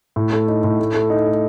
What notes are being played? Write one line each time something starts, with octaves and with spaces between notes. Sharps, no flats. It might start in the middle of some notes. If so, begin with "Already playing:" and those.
A2
A3
D#4
A2
A3
A3
D#4
A3